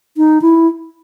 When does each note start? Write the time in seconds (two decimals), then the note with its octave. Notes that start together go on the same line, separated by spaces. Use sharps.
0.17 D#4
0.42 E4